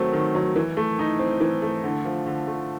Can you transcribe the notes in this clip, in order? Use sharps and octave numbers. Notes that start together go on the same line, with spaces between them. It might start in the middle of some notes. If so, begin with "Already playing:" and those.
Already playing: D#3 F#3 A3 C4
D#3
F#3
E3
A3
D#4
C4
E3
A3
D3
F3
D3
A3